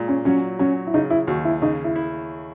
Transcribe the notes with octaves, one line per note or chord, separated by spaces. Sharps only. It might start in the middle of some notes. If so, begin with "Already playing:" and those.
Already playing: A#2 G#3
C#4
F#3 C#4
F#3 C#4
E4
C#3 D#4
E4
D#2 F#4
E4
C#3 D#4
E4
E4